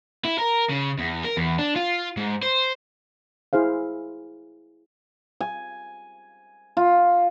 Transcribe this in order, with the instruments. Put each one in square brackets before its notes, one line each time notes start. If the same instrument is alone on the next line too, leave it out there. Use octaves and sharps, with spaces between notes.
[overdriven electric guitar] E4
A#4
C#3
E2
A#4
E2
D4
F4
G#2
C5
[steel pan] E4 G#4 C5 F5
[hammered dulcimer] G#5
F4